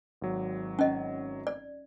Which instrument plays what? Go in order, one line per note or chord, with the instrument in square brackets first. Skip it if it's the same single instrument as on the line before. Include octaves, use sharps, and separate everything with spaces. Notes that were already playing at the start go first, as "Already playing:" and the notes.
[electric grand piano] G#1 F#3
[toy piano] C#4 D#5
D5